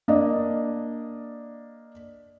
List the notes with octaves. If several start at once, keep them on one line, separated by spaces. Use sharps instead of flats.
A#3 D4 A#4 D5 D#5